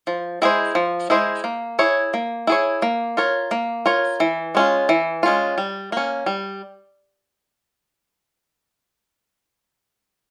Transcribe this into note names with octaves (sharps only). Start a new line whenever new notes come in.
F3
G#3 E4 G#4 C5
F3
G#3 E4 G#4 C5
A#3
E4 G#4 C#5
A#3
E4 G#4 C#5
A#3
F4 A#4 C#5
A#3
F4 A#4 C#5
E3
G#3 C#4 F4
E3
G#3 C#4 F4
G3
A#3 C#4
G3